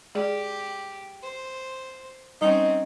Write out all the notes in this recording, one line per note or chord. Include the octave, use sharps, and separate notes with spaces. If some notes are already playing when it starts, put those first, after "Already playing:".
G#3 G4 G#4 D5
C5
G3 C4 C#4 D#4